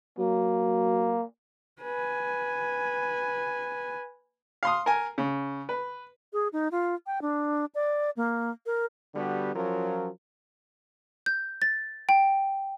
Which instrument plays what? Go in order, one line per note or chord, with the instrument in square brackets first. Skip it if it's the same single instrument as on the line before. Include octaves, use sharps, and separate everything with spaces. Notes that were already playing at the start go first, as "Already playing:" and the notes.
[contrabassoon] F#3 [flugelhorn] A#3
[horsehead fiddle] B4 G#5
[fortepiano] F5 C6 D#6
A#4 G#5
C#3
B4
[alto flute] G#4
D#4
F4
G5
D4
D5
A#3
A#4
[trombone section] D3 G3 B3 F#4 G4
F3 F#3 C#4 F4 A#4
[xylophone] G6
A6
G5